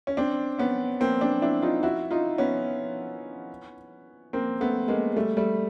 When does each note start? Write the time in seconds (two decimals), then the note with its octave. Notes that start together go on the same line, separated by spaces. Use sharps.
0.07 C#4
0.17 C4 D4
0.58 B3 C#4
1.00 A#3 C4
1.21 C4 D4
1.42 D4 E4
1.62 D#4 F4
1.83 E4 F#4
2.11 D#4 F4
2.38 B3 C#4
4.33 A#3 C4
4.61 A3 B3
4.88 G#3 A#3
5.16 G3 A3
5.37 G3 A3